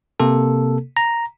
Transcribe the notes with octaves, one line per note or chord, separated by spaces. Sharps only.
C3 A#3 A4
A#5